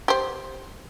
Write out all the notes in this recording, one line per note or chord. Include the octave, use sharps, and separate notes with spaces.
G4 C5